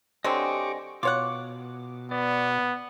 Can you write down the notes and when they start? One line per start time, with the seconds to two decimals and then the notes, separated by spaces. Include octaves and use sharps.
0.24 D3 F#3 C4 G4 D#5 G#5 C#6 D6
1.03 B2 F4 C#5 F#5 D6
2.11 B3 D5